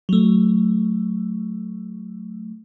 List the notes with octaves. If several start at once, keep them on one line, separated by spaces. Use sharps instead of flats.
F#3 A3